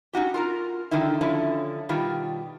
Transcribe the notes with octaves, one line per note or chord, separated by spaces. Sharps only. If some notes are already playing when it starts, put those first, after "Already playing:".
C#4 D#4 F#4 G4
F4 A#4 A#5
D3 D#3 F3 D#4 E4
D3 F3 C#4 E4
B2 D#3 G3 F4